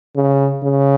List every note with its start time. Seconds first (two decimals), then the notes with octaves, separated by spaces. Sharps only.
0.16 C#3
0.63 C#3